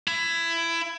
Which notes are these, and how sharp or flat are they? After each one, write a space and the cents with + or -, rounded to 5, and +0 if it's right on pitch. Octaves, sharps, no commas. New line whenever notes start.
E4 +20